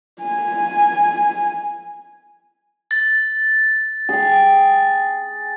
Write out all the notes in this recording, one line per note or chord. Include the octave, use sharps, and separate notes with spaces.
G#5
A6
G#4 G5